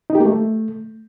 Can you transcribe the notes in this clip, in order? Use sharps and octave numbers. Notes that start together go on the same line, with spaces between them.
D#4
G4
A#3
A3